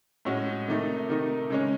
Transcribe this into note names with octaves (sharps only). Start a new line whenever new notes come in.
A2 G#3 C#4 F#4
C3 D#3 A3 D#4
C3 D#3 A3 D#4
C#3 G#3 C#4